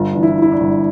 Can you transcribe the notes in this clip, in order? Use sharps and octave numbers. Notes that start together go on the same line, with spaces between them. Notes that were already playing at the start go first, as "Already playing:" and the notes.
Already playing: G1 F4
E3 D4
E4
E3 E4
D4
G1